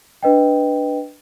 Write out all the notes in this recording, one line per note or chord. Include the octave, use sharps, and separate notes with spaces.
D4 B4 D#5 G5